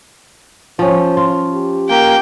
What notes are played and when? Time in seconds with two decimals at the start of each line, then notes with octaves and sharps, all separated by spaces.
0.79 F3 C#4 C5
1.17 F4
1.53 G4
1.90 A#3 G5